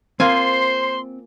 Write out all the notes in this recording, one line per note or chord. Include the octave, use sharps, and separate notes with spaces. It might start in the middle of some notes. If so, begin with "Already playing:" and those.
A#3 C4 F4 C5 G#5 C6